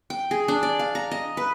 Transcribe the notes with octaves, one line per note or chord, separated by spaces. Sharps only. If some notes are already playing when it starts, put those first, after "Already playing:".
G5
G#4
D4
D5
F5
A#5
D#5
B4